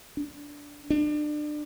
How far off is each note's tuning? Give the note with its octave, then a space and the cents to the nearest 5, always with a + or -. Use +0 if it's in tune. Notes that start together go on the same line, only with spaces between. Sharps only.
D4 -15
D4 +30